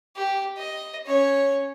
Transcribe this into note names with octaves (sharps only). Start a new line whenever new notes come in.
G4
D#5
C#4 C#5